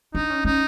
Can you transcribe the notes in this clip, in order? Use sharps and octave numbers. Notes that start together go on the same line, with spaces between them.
D4 D#4
C#4
C#4 D#4